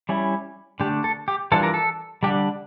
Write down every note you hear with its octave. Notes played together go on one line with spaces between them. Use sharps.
G3 C#4 E4
D3 A3 D4 G4
A4
G4
E3 G3 D4 F4 A4
A#4
A4
D3 G3 D4 G4